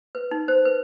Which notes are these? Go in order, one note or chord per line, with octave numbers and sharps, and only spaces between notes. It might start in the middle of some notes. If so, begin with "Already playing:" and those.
B4
D#4
C5
B4